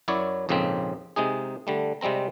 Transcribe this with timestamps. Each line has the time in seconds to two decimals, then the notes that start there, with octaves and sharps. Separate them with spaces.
0.08 F#2 F#3 E4 C#5 D5
0.49 A#1 F2 G#2 C#3 A#3 C4
1.16 C3 G#3 D#4 G#4
1.67 D3 G3 A3
2.01 C3 G3 G#3 C4 A#5